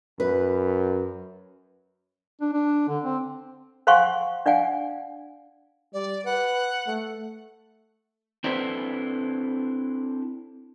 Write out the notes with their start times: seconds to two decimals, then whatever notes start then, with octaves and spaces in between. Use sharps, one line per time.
0.20 F#2 B4
2.41 D4
2.53 D4
2.88 D3
3.04 C4
3.87 C5 F5 F#5 G#5 C6 C#6
4.46 D4 D5 F5 F#5 G#5
5.93 G3 D5
6.25 B4 F#5
6.87 A3
8.44 C4 D4 E4 A4 B4 C5